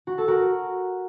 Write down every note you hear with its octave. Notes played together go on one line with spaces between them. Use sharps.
F#4
A4
F#4 A#4